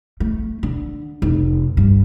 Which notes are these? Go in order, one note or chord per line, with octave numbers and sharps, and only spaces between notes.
A3
D3
F1
G2